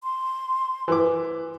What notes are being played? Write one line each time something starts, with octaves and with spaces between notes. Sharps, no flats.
C6
E3 D6